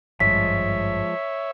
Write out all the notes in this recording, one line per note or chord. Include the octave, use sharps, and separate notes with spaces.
G#1 G2 F3 G#3 C#5 E5 B6